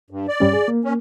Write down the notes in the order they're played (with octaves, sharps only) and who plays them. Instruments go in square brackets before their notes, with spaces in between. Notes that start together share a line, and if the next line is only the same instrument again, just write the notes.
[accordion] G2
D5
[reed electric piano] G2 G3 C#4
G#4
A#3
[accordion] C#4